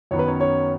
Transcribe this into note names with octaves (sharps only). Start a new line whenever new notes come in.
F#2 D#3 F#3 B3 C#5
B4
C#4 C#5
C#4 C#5